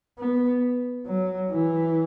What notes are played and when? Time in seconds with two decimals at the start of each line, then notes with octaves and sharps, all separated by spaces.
0.19 B3
1.07 F#3
1.51 E3